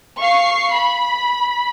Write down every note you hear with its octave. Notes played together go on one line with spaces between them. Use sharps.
F5 C#6 C7
B5